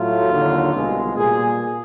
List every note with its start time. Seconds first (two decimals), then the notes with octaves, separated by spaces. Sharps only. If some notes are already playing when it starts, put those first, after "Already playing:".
Already playing: A2 F#3 A3 F4
0.29 D#2 D3 F#3
0.73 C2 B2 G#3
1.16 A#2 G3 G#4